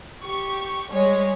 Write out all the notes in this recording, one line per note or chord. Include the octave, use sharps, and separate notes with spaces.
G4 C#6
G3 G#3 C#5